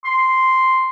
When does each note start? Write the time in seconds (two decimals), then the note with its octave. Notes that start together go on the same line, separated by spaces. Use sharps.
0.05 C6